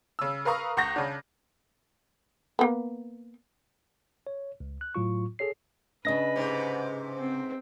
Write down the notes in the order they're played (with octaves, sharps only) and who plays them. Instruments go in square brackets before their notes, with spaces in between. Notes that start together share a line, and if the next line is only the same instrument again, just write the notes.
[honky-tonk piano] C#3 E6
A#4 B4 F5 A#5 C#6 D#6
C#2 F#5 C#6 G6 A#6
C#3 D4
[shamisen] A#3 B3
[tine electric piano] C#5
C#2
F#6
A2 F#3 F4 C#6
G#4 A4 C#5 C7
[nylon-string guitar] C#3 D4 [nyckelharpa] B4 [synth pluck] D#5 A#6
[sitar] G#2 C3
[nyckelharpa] C4